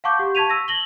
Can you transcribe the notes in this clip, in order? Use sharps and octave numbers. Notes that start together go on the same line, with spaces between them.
F5 F#5 A5 C#6 D6 G6
G4
A5 C#6 G#6 B6 D#7 F7
E6 A#6
A#6 F#7 G7